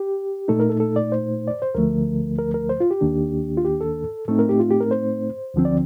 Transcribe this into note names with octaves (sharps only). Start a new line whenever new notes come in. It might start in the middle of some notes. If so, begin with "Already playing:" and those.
Already playing: G4
A#2 A3 D#4 A4
A#4
A4
A4
D5
C5
D5
C5
D2 D3 F3 A3 A#4
A#4
A#4
C5
F4
G4
D#2 D#3 A#3 D4
F4
G4
A4
A2 A3 C4 D#4 A4
A#4
G4
F4
G4
A#4
C5
D2 D3 F3 C4
D5